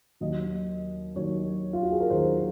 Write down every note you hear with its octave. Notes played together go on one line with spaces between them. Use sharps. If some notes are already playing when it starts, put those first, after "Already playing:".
D#2 D#3 F#3 D#5
D#2 D#3 F#3 C#5
F4
F#4
G#4
A#4
D#2 D#3 F#3 C5